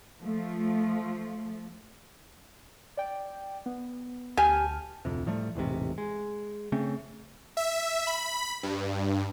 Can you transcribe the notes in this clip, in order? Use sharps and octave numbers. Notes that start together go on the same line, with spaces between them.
F3 A3
D5 G5
B3
D2 G4 G#5 A5 F6
D1 F2 C3
A2 F3 G3 A3
E1 A1 G#2 C3
G#3
C#3 A3 C4 C#4
E5
B5
G2